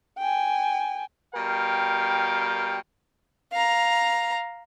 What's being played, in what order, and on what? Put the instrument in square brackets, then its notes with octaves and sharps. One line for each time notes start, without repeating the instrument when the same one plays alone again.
[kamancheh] G5 G#5
[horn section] B2 G3 A#4 F5 G5
[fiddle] F5 A#5